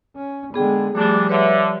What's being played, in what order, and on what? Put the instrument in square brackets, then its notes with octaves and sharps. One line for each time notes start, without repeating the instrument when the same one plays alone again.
[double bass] C#4
[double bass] D3 G#3 [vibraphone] B3 G#4 G5
[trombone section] G#1 E3 D4 [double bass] F3 G3 [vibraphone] A3 G#4 D6
[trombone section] D3 [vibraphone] B4 C#5 E5